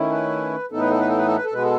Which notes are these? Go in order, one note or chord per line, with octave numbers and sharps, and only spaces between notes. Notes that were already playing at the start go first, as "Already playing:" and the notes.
Already playing: D#3 A3 C#4 E4
B4
A2 E3 B3 D#4 A4
B4
A4
B4
A4
B4
A4
B4
A4
B2 G#3 B3 B4
A4